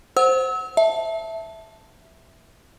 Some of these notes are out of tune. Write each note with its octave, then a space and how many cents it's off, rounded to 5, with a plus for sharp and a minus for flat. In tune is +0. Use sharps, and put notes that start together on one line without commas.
C5 +0 F#5 +0 E6 -35
E5 -5 A5 +0